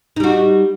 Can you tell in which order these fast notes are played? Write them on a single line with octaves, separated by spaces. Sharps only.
D#4 G3 F#4